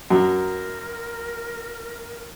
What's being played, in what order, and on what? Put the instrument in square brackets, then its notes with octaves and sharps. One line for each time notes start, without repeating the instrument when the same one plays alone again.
[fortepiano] F#2 [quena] A#4